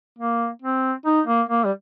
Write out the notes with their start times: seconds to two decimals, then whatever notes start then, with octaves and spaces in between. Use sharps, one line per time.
0.18 A#3
0.62 C4
1.06 D#4
1.27 A#3
1.49 A#3
1.64 G3